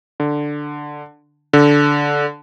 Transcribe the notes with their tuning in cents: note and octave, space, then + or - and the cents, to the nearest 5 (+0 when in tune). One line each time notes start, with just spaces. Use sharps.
D3 +5
D3 -10